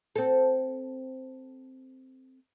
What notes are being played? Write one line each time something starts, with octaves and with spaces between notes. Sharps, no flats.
C4 A4